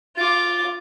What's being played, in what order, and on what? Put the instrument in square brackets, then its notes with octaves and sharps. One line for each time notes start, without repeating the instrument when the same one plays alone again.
[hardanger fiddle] F4 D6 [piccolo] A6